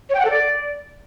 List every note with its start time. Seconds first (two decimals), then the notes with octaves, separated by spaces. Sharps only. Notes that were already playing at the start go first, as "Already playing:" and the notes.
0.09 C#5
0.15 G5
0.20 F#5
0.25 A4
0.30 D5